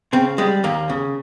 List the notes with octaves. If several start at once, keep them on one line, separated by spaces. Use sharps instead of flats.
C#3 C4
G3 G#3
D#2 A#3
C#3